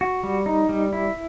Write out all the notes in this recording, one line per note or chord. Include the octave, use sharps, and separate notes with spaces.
F#4
G3
D#4
G3
E4